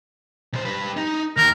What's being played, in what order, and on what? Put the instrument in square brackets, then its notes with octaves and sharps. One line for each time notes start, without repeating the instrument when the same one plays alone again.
[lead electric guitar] B1 C5
G3 B4
D#4
[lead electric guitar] D#2 [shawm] A#4